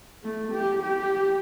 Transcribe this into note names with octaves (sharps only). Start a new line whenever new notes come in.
A3
G4
G4